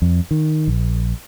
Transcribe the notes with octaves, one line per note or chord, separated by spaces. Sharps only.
F2
D#3
A#1